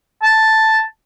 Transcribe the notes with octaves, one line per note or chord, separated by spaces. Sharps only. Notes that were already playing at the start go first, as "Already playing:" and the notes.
A5